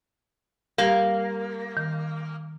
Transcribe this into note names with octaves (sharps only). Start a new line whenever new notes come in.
G3 A#3 G4 G#6
D#3